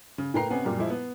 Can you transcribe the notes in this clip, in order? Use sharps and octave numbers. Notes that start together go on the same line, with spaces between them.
C#3
A2 A#3 B4 G5 A#5 C7
C3 B3 C#4 F#5 G#5
F#2 A#2 G3
F3 G#3 E4
B3